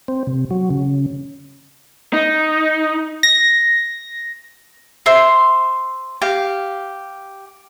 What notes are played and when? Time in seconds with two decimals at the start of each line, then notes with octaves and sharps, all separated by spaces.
0.08 C4
0.27 C3
0.51 F#3
0.70 C#3
2.13 D#4
3.23 A#6
5.06 C5 E5 C6
6.22 G4 F5